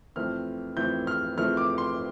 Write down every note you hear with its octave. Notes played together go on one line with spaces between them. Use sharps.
F2 E3 A3 C4 F6
F2 E3 A3 C4 G6
F6
F2 E3 A3 C4 F6
D6
C6